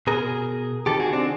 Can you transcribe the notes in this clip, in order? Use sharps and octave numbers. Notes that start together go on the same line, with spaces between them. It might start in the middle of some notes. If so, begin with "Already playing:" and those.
B2 G#4 A#4
C3 D#3 G4 A4
F#4 G#4
C4 D4